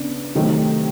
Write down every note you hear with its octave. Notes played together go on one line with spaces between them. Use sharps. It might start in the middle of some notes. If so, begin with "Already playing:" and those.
Already playing: C#3 B3 D4
C3 D#3 F#3 A3 C4